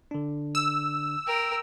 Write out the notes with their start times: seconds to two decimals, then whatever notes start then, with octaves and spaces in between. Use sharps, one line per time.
0.11 D3 D4
0.55 E6
1.27 A#4 G5